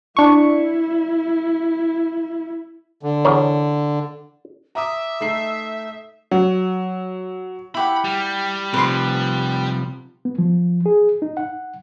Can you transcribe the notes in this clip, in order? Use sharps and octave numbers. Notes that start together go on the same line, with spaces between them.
D4 E4 C#6
D3
E2 A#4 C#5
E5 A#5 D6 D#6
A3 D#4 C7
F#3
E4 G4 F#5 B5
G3
C3 F3 B4 C6
B3
F3
G#4
D#4
F#5